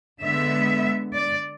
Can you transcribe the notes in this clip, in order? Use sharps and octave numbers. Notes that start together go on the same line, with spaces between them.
D3 G#3 B3 E5
D5